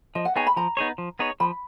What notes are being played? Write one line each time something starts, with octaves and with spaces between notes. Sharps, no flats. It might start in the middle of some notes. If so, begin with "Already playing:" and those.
F3 D#5
F#5
B3 D#4 G#4 C#5 G#5
B5
F3 A#5
B3 D#4 G#4 C#5
F3
B3 D#4 G#4 C#5
F3 B5